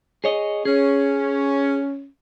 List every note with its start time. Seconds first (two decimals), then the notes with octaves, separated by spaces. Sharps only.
0.24 G#4 C#5 D#5
0.65 C#4 G#4